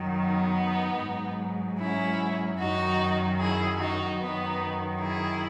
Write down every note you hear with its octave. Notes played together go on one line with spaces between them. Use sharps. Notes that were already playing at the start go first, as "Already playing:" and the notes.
Already playing: F#2 D#3 F#3
B3 D#4
G#2 F#3
C#4 E4
F#2 D#3 F#3 D#4 F#4
E4 G#4
D#4 F#4
F#2 D#3 F#3 B3 D#4
E4 G#4